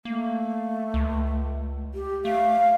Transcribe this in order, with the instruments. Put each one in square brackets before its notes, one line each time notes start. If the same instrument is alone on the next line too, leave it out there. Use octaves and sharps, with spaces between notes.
[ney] A3 [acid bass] A#3
[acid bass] C#2
[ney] G4
[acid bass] A3 [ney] F5